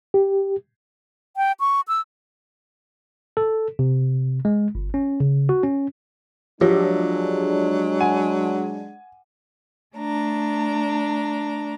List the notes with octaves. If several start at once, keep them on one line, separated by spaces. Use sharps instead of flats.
G4
G5
C#6
E6
A4
C3
G#3
G1
C#4
C#3
F#4
C#4
F3 F#3 G#3 D4 F4 G4 C#5
F#5 G#5
A3 D4 A#5